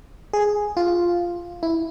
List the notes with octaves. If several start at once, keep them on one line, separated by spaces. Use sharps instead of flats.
G#4
F4
E4